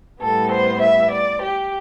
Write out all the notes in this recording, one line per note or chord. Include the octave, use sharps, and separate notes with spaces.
A2 G3 B3 A4
C5
E5
D5
G4